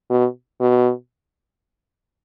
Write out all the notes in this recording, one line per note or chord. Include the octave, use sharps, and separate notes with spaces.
B2
B2